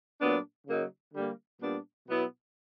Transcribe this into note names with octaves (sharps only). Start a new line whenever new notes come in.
A#2 F#3 B3 D4
C#3 F#3 A#3 D#4
D3 G3 A#3
A#2 G3 B3 D4
B2 F#3 B3 E4